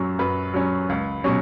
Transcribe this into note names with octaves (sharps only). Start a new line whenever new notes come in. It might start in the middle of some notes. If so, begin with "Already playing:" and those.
Already playing: F#2 F#3 C#4
F#2 B4
F#3 C#4
C#2
B2 F#3 C#4